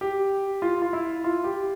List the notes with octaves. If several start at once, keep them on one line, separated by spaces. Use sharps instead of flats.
G4
F4
F4
E4
F4
G4